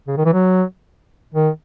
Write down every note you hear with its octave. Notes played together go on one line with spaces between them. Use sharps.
C#3
D#3
E3
F#3
D#3